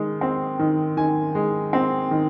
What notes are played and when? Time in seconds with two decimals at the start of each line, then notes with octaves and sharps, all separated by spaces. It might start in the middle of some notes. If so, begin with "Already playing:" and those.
Already playing: D#3 G#3
0.21 C4
0.59 D#3
0.97 D#3 G#5
1.35 G#3
1.73 C4
2.11 D#3